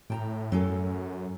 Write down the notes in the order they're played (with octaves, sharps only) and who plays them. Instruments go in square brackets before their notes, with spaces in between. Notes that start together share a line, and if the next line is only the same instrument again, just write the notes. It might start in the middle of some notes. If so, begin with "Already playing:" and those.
[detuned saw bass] A2 [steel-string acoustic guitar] G5 A5 A#5
[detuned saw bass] F#2 [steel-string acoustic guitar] F#3 C#4 A4